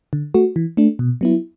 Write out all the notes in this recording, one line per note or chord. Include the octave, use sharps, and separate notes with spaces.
D3
A3 F#4
E3
A3 D4
B2
F#3 B3 E4